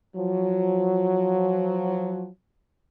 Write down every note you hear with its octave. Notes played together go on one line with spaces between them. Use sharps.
F3 F#3